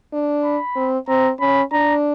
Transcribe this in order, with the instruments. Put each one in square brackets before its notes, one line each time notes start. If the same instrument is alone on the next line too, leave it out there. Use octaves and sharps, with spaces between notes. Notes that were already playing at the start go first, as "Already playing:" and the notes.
[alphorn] D4
[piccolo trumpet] B5
[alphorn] C4
[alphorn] C4 [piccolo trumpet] A#5
[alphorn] C#4 [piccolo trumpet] B5
[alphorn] D4 [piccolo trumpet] A#5